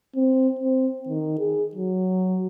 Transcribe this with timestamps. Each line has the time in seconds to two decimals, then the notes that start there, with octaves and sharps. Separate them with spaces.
0.16 C4
0.59 C4
1.08 D#3
1.39 G#4
1.75 F#3